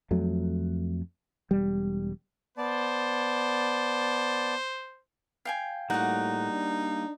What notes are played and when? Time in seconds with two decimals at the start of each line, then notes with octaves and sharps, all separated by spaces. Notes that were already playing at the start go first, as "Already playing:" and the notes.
0.11 F2 F#3 A3
1.51 E1 G3
2.58 B3 C5 D5 A5
5.45 F5 G5 G#5
5.90 A2 G3 A#3 D#4 F#4 F#5
6.51 D4